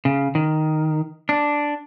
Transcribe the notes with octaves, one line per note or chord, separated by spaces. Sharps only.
C#3
D#3
D4